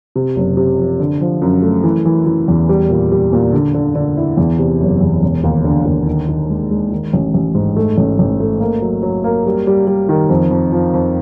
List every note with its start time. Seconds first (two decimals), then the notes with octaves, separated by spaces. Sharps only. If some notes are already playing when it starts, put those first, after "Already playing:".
0.16 C3
0.36 F#1
0.57 C3
0.78 F3
1.00 D3
1.21 F3
1.42 F#2
1.62 A3
1.84 E3
2.05 E3
2.26 E3
2.48 E2
2.69 G3
2.90 A#2
3.12 G3
3.33 A#2
3.53 D3
3.74 D3
3.95 D3
4.17 E4
4.37 E2
4.59 C3
4.81 F#1
5.01 E2
5.22 E1
5.44 D#2
5.64 D3
5.85 D#2
6.06 D#3
6.29 D#3
6.50 G#3
6.71 G#3
6.92 D#3
7.13 A1
7.34 A1
7.55 G#2
7.77 A3
7.98 A1
8.19 A1
8.40 A3
8.60 A#3
8.82 F#3
9.03 F#3
9.24 A#3
9.46 G3
9.67 G3
9.87 G3
10.09 D#3
10.29 F2
10.51 F2
10.72 F3
10.94 F2